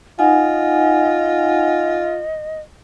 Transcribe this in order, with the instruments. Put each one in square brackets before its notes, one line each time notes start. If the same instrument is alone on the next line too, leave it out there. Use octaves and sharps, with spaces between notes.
[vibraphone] D#4 F#5 G#5 [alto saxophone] F4 [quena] D#5